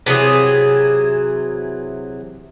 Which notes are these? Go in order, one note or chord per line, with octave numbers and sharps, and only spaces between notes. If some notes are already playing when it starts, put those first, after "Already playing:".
C3 E3 F#3 G#4